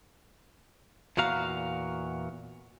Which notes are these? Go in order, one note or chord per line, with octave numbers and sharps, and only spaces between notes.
E2 A#2 F#4 F5 A#5